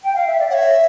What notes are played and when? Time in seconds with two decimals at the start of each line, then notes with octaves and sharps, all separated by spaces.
0.03 G5
0.15 F5
0.26 E5
0.38 D5
0.50 C#5 F#5
0.54 E5